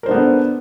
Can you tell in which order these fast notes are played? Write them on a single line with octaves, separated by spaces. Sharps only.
A#4 C5 D4 B3 A4